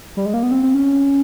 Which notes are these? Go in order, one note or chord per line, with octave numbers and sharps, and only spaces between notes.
G3
G#3
A#3
B3
C4
C4
C#4